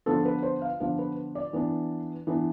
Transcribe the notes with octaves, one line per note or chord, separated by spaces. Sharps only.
D3 F3 B3 D4 A4
B4
C5
F5
D3 F3 B3 D4 F5
B4
D5
E3 B3 D4
E3 B3 D4